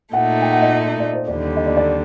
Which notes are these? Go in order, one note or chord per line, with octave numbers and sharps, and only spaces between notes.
A#2 A3 D#4 F#5
G5
F#5
D#5
D5
C5
D#2 D3 G3 D5
D#5
D5
D5